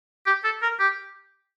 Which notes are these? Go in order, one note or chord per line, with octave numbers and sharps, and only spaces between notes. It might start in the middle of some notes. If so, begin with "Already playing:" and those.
G4
A4
A#4
G4